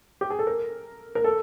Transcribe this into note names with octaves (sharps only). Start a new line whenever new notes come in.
G4
G#4
A4
A#4
A#4
A4